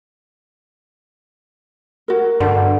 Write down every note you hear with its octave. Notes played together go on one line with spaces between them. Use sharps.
F#4 A#4
G2 D3